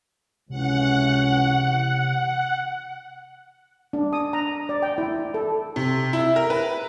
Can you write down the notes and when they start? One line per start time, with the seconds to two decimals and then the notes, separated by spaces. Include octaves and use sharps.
0.50 C#2 C3 E3 C#4 F#5
3.93 D4
4.13 D#6
4.33 A#5
4.69 D5
4.82 G5
4.98 E4
5.34 A4
5.76 C3
6.13 E4
6.36 A#4
6.50 B4